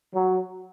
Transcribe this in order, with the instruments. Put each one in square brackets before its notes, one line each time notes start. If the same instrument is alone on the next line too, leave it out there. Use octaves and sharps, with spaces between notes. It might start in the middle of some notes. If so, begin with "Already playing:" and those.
[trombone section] F#3